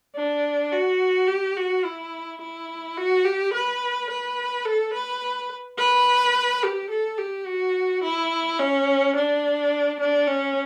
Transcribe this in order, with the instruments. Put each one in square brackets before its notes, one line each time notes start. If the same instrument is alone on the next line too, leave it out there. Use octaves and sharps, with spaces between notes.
[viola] D4
F#4
G4
F#4
E4
E4
F#4
G4
B4
B4
A4
B4
B4
G4
A4
G4
F#4
E4
C#4
D4
D4
C#4